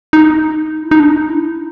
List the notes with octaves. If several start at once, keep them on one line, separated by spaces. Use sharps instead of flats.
D#4
E4
D#4
D4
D#4
E4